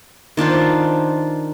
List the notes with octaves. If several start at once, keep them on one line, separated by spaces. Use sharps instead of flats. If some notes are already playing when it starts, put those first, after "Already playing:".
D#3 D4 F4 C5